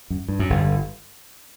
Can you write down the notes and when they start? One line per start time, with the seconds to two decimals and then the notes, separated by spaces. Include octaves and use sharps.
0.10 F#2
0.29 G2
0.39 F#2
0.50 G1 G2